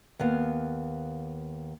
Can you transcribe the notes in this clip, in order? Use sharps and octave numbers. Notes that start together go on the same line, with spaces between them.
D#2 B3 F5